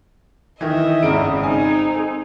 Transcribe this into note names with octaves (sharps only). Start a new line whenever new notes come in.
D#3 E3 D#5 E5
G#1 C#3 D7
C4 D#4 G#4 G#5